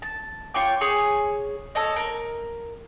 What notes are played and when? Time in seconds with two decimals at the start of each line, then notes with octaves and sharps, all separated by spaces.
0.02 A5
0.54 F4 C#5 G5 D6
0.81 G#4 C#5
1.75 A4 C#5 D#5
1.96 A#4